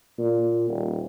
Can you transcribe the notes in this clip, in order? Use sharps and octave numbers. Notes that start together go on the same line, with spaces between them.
A#2
D#1